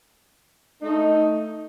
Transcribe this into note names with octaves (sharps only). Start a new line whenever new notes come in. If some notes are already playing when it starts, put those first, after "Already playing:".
A3 D#4